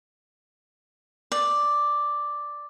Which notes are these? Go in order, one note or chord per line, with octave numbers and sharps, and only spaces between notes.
D5